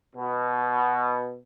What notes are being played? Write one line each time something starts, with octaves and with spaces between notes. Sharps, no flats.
B2